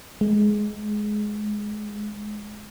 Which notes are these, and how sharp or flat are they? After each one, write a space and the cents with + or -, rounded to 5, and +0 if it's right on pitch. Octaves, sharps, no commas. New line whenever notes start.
G#3 +15